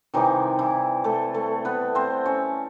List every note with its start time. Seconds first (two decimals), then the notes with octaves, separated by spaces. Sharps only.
0.14 C3 D#3 E3 G3 D#4
0.59 E3 E4
1.04 A3 A4
1.34 A3 A4
1.65 B3 B4
1.95 C4 C5
2.25 C#4 C#5